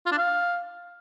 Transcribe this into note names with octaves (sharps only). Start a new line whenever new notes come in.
F4
D4
F5